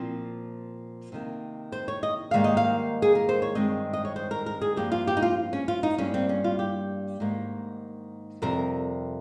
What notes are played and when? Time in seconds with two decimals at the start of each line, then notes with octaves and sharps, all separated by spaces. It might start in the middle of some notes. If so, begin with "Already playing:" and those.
Already playing: A#2 F3 C4
1.12 C3 D#3 A#3
1.72 C5
1.88 C#5
2.03 D#5
2.31 G#2 D#3 G3 A#3 F5
2.44 D#5
2.57 F5
3.02 G#4
3.15 A#4
3.29 C5
3.42 C#5
3.55 G2 D#3 G#3 C4 D#5
3.93 D#5
4.05 C#5
4.16 C5
4.31 A#4
4.46 A#4
4.61 G#4
4.77 G2 F3 A#3 G4
4.92 F4
5.07 G4
5.17 D#4
5.22 F4
5.53 C#4
5.68 F4
5.83 D#4
5.98 G2 G3 A#3 C#4
6.14 C4
6.29 C#4
6.44 F4
6.59 G4
7.20 G#2 D#3 A#3
8.42 F2 C3 G3 A#4